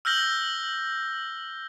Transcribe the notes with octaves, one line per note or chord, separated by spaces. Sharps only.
E6 F6 G6 A#6 F#7 G7